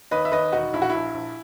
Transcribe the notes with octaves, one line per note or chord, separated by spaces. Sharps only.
D#2 B4 D#5
E5
D#2 B4 D#5
E1 D#4 F#4
A#1 E4
F#4
A#1 E4
A#1